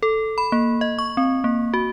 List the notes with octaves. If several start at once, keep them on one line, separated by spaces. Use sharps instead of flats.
A4
B5
A#3
D#5
C#6
C4
A#3
F#4